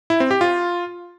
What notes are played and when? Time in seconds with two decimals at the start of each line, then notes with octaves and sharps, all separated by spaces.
0.10 E4
0.20 C4
0.31 G4
0.41 F4